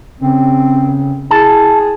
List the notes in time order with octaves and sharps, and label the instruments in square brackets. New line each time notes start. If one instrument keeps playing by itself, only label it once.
[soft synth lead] C#3 [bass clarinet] C4
[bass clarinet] E4 [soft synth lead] G#4 [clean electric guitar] A5